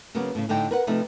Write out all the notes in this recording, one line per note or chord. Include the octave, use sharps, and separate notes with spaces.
C#3 F#3 A#3 B3
A2 C#3
A2 D3 D#4 D5 G5
A#4 B4 F#5
C3 F3 A3 D#4 B4